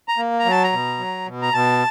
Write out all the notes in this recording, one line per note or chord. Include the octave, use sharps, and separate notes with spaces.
A#5
A#3
A#5
F#3
A5
A#5
B2
F#3
B2
A#5
B2 A5